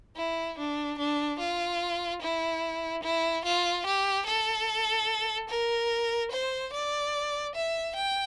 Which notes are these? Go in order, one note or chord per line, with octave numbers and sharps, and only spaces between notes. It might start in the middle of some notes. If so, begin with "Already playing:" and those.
E4
D4
D4
F4
E4
E4
F4
G4
A4
A#4
C5
D5
E5
G5